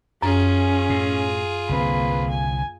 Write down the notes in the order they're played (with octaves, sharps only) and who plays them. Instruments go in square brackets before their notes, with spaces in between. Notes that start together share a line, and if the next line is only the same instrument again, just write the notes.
[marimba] F#2 [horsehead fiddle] C#4 [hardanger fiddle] F4 G#4
[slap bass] A2
[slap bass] C2 D3 C4 [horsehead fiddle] A#3 B4
[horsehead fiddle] G#5